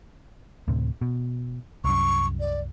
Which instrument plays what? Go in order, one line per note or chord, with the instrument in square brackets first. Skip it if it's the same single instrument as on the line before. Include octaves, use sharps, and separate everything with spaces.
[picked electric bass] D2 A2 C3
B2
[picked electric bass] C2 F#2 [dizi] C#6
[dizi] D5